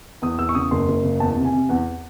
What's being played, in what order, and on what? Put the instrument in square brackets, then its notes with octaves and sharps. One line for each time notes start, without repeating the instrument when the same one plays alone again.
[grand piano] E2 D#6
E2 E6
C#6
C#3 D#6
F#1 C6
F#1
C#3
E2 A5
C3
G#5
C3
E2 F#5